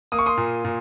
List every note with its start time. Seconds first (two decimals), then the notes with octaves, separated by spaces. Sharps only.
0.12 A#3 D#6
0.19 C#6
0.26 C6 D#6
0.37 A#2
0.65 A#2